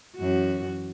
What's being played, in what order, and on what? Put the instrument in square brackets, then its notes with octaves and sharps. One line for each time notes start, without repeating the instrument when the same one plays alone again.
[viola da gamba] F#2 E3 F#4